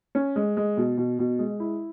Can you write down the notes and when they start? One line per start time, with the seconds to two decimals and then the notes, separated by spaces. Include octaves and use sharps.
0.15 C#4
0.36 G#3
0.57 G#3
0.77 B2
0.97 B2
1.19 B2
1.39 G#3
1.60 E4